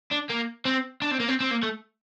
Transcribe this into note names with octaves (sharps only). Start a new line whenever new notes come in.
D4
A#3
C4
D4
C4
A#3
C4
C4
A#3
A3